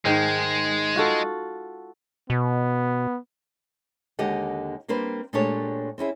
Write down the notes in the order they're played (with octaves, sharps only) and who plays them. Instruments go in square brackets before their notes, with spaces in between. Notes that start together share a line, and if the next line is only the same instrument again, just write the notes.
[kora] G#2 D#3 [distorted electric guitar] G#3
[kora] F4 F#4 A4
[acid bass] B2 [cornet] B3
[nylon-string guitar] D#2 D3 G#3 G4 D#5 F#5
G3 A#3 C4 D4 B4 C5
A#2 G#3 A3 D4 G4 C#5
C4 C#4 E4 G#4